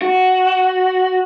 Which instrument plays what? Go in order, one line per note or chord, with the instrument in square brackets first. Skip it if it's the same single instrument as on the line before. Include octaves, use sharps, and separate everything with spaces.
[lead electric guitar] F#4